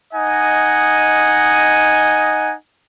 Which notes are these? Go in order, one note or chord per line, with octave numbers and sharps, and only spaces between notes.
D#4 D#5 F#5 G#5